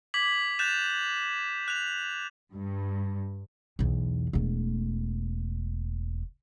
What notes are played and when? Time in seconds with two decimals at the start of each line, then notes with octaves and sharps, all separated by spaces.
0.14 D6 G#6 B6 F#7
0.59 F#6 G6 A6 E7 F7
1.68 F#6 F7
2.52 G2
3.79 B1 E2
4.33 E1 A3